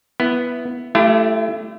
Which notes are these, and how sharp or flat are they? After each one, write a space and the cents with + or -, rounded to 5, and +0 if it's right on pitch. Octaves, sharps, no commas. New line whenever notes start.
B3 +0 E4 +5
A3 -5 E4 +45 G4 +0